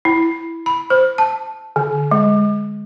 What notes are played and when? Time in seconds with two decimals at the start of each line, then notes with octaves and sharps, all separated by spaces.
0.05 E4
0.66 B5
0.90 C5
1.18 A5
1.76 D3
2.11 G#3